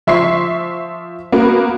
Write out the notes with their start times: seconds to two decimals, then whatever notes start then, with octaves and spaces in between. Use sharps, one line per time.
0.07 F3 E5 C6 C#6 C7
1.32 A#3 B3 F#4